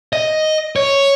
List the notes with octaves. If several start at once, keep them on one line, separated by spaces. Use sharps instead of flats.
D#5
C#5